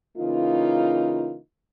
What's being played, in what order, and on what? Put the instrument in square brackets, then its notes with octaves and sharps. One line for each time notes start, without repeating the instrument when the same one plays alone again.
[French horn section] C#3 E3 A#3 D#4 F4